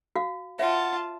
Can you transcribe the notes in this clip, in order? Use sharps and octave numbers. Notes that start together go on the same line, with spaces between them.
F#4 F5
F4 C#5 E5 F#5 A5